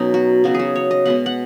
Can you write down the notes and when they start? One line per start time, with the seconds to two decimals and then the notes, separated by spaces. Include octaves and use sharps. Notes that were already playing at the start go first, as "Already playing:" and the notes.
Already playing: B2 F#3 C#4 D#4
0.14 F#4
0.44 C#3 F#3 B3 F#4
0.54 F#4 G#4
0.75 C#5
0.91 D#5
1.05 B2 G#3 B3 F#5
1.26 F#5